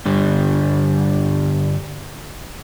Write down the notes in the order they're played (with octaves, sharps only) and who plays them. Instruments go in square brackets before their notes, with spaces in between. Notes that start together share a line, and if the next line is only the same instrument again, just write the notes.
[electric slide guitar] G2 D3 G3